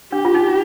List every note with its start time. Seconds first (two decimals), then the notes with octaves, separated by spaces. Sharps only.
0.12 D4 G4
0.25 F4
0.34 D#4